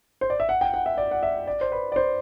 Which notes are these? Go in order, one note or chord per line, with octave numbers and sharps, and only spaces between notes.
C5
D5
E5
F#5
G5
F#5
E5
D5
F#5
E5
D5
C5
B4
D5
C5